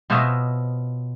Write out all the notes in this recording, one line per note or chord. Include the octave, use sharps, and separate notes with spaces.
B2 F4 C5 C#5 D#5 E5